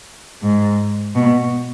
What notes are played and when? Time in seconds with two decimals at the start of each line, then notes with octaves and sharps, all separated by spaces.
0.42 G#2
1.15 B2